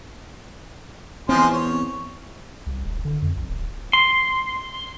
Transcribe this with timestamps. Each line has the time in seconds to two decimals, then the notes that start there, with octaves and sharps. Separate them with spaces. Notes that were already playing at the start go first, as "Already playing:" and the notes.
1.29 E2 F3 G#3 C4 C6
1.53 C#5
2.66 C2
2.85 D#1
3.05 D3
3.22 F2
3.36 B1
3.49 D1
3.93 C6